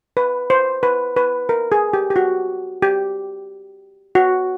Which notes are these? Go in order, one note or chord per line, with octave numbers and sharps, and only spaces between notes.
B4
C5
B4
B4
A#4
G#4
G4
G4
F#4
G4
F#4